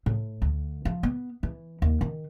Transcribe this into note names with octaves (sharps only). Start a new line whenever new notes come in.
A2
D2
F3
B3
E3
D#2
D#3